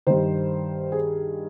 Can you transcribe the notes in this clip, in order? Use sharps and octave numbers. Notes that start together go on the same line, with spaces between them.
G2 D#3 C5
G#4